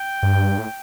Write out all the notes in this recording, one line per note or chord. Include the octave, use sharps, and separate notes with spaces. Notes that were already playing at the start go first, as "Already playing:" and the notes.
Already playing: G5
G2
A2